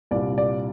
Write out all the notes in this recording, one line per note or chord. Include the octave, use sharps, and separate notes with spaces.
C2 A#2 G3 D5
D5